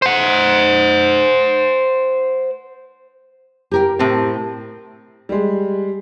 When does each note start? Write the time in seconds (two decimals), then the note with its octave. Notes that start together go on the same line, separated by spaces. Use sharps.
0.02 C5 F#5
3.71 G4 A#4 G5
3.99 A2 C4
5.29 G3 G#3